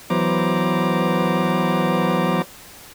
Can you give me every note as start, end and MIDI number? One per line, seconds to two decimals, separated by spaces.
0.10 2.42 52
0.10 2.42 54
0.10 2.42 59
0.10 2.42 72
0.10 2.42 82
0.10 2.42 86